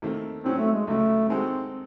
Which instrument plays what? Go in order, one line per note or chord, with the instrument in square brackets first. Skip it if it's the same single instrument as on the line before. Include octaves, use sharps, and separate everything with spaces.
[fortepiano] D#2 D#3 A3 C4
[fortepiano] G#2 F#3 C#4 [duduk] C4
[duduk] A3
G#3
[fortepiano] C#2 C#3 F#3 [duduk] A3
[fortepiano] D#3 G#3 D#4 F#4 A4 [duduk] C4